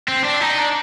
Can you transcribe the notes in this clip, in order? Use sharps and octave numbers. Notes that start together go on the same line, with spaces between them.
C4
D4
D#4
D4